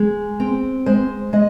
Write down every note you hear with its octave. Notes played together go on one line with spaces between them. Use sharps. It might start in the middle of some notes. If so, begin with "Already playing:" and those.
Already playing: G#3
C4
G#3 C5
G#3 D#5